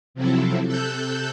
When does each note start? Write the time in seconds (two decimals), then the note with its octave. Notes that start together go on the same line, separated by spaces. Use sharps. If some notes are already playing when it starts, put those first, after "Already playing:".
0.14 C3 F3 F#3 C4 E4 A4
0.66 C3 A4 E6 F#6 G6